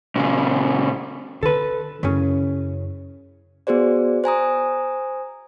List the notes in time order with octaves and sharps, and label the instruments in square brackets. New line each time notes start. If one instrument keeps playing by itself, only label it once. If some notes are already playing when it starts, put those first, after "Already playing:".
[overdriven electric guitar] A#2 C#3
[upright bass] D3 [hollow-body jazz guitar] A4 B4
[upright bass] F#2 E4 [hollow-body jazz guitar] C#3 C#4
[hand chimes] B3 F#4 G#4 C5 D5
C5 G#5 A#5 D#6